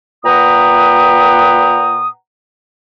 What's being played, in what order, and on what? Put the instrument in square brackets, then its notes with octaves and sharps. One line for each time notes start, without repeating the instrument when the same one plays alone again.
[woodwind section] A#2 B4 F#5 G5 A#5 D#6